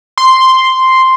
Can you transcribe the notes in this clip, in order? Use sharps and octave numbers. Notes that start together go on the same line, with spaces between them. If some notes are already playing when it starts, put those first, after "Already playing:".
C6